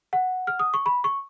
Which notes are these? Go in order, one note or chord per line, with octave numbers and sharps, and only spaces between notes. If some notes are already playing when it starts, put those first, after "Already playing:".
F#5
F6
D#6
C#6
B5
C#6